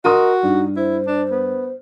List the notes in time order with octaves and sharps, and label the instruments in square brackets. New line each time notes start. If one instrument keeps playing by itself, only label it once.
[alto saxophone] F#4 [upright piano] A#4 C6 D#6 [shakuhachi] D#5
[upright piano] G2 [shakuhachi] D#4
[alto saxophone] E4 [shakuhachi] C5
[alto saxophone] D4
B3